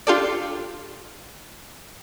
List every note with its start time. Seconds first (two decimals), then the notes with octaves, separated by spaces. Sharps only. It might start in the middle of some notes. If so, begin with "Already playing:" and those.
0.07 D4 F4 G4 A4 D5